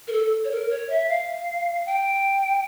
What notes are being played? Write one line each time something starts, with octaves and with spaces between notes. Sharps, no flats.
A#4
A4
C#5
A#4
C#5
E5
F5
G5